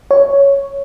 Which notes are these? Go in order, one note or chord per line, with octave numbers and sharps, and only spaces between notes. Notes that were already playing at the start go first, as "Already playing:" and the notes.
C#5